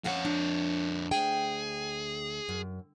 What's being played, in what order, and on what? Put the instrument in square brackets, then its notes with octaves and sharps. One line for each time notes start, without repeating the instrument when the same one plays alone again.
[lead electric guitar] F2 C#5 [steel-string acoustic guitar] C#4 F5 F#5
[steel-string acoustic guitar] D4
[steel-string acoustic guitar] D2 G5 [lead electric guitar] G#4
[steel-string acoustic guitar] F#2